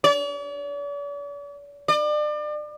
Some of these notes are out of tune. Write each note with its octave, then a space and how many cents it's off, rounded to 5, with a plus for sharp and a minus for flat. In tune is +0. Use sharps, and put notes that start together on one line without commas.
D5 -45
D5 +35